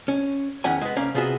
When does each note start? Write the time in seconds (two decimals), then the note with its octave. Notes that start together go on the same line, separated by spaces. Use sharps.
0.08 C#4
0.64 E2 D#3 C#4 E4 F#5 G#5
0.82 G#3 B3
0.96 C2 A#3 C#4 F5
1.15 C3 B3 F4 F#4 G#4 E5